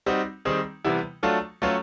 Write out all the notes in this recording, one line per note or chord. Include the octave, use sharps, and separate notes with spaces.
G3 C4 D#4 F#4
D#3 G3 C4 D#4 G#4
C3 E3 G3 B3 E4
F#3 A3 D4 F4 A4
F#3 A3 C#4 F4 A4